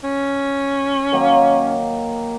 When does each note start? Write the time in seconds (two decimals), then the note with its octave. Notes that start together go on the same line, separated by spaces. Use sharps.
0.04 C#4
1.12 D#3 F#3 A#3